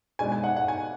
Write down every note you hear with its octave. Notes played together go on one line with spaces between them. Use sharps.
B2 G#3 D4 G#5
G#5
F#5
F#5
G#5